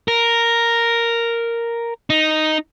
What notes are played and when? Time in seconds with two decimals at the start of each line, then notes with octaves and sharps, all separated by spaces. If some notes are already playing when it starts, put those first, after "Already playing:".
0.08 A#4
2.10 D#4